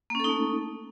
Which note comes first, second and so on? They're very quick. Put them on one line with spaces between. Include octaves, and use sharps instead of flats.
A#3 C#4 A4 D#4 A3